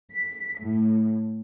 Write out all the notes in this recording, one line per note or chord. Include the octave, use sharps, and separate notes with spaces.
B6
A2